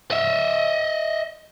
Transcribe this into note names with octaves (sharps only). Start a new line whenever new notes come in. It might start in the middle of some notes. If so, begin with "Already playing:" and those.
D#5 E5